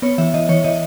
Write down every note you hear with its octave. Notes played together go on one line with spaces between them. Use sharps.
B3 C#5
E3 E5
E3 D#5
E3 C#5
E3 D#5